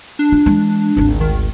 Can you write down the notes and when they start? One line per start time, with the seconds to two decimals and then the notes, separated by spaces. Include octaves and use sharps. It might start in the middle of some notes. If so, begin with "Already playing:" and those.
0.19 D4
0.32 F4
0.46 E3 G#3
0.97 G#1 D2
1.21 D#3